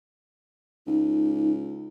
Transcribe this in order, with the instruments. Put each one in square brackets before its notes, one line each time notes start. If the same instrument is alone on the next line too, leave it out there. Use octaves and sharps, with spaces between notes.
[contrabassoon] C#2 [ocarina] D#4